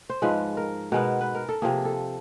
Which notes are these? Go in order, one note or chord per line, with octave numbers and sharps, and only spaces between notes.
C5
G#2 F3 G#3 B4
A#4
B2 G#3 B3 A#4
B4
A#4
A4
C3 F3 A#3 G#4
A4